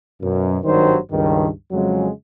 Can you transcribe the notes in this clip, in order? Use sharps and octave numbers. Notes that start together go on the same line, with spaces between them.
F#2 B2
G#1 G2 D#3 F#3 G3 C5
C#2 G2 D#3
F2 C#3 F#3 G#3